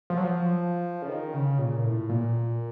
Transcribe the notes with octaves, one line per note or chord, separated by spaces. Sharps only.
F3
F#3
F3
C#3
D#3
C#3
A#2
A2
A#2